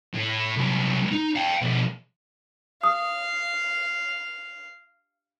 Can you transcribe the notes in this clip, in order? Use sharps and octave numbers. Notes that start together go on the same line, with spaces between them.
A2
C2 F#3
D#4
F5 G5
B2 F3
F5 D#6